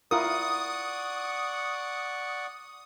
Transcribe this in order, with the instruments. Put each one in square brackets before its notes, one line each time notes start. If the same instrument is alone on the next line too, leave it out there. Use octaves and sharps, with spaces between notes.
[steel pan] E4 F4 A#4 [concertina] D5 F#5 C#6 [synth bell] D#6